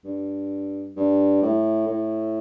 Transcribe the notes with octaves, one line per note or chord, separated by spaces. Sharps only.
G2
G2
A2
A2